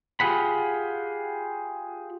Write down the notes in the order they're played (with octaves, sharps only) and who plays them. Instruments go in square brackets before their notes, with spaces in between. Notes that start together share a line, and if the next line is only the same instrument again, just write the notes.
[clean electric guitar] F4 G4 G#4 F#5 B5